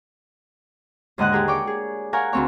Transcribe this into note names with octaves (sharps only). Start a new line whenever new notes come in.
D#2 G#2 D3 D#5 F#5 F#6
G4 G#4 A#4
C#5 D5 G5 D6
G#4
A#4 C#5 F5 F#5 G#5
D2 C4 C#5